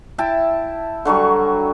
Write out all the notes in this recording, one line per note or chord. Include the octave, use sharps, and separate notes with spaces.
E4 E5 G5 A5
D3 F#3 G3 C#6